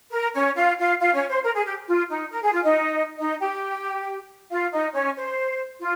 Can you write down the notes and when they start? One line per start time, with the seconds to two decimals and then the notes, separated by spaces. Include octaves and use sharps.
0.12 A#4
0.34 C#4 C#5
0.56 F4 F5
0.78 F4 F5
0.99 F4 F5
1.14 C#4 C#5
1.29 C5
1.43 A#4
1.55 G#4
1.66 G4
1.87 F4
2.09 D#4
2.31 A#4
2.42 G#4
2.53 F4
2.63 D#4 D#5
3.18 D#4 D#5
3.40 G4 G5
4.50 F4 F5
4.72 D#4 D#5
4.93 C#4 C#5
5.16 C5
5.80 F4